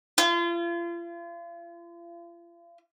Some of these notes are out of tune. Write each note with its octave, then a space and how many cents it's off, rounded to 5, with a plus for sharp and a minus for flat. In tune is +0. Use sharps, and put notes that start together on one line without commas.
F4 -40